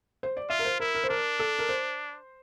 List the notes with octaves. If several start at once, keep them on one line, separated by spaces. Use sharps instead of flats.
C5
D5
F4 E5
A#4
C5
E4 A#4
A#4
C5
D4 A#4
A4
A#4
C5